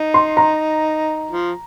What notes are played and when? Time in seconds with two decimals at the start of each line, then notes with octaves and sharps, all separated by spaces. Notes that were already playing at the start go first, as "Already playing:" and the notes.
Already playing: D#4
0.14 C6
0.37 A#5
1.31 F3